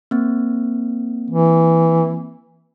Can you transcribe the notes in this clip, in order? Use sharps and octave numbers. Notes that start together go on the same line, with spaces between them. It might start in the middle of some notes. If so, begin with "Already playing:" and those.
A#3 C4
E3